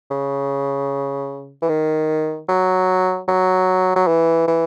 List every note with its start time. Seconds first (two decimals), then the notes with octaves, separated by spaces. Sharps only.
0.11 C#3
1.62 E3
1.69 D#3
2.49 F#3
3.28 F#3
3.96 F#3
4.07 E3
4.48 E3